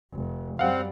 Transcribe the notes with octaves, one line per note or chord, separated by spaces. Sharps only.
F1
F#2 G3 C4 F5 F#5